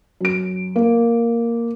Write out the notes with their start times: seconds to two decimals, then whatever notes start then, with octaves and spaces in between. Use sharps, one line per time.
0.21 F#2 D7
0.76 A#3